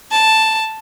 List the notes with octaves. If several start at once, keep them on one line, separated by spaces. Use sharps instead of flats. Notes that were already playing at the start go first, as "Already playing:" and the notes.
A5